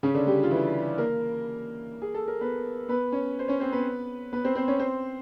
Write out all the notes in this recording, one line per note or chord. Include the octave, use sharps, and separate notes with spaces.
C#3 C#4
D3 D4
G3 G4
F4
E3 E4
A#3 A#4
G#4
A4
A#4
B3 B4
B3 B4
C#4 C#5
C5
C#4 C#5
C4 C5
B3 B4
B3 B4
C4 C5
C4 C5
C#4 C#5
C4 C5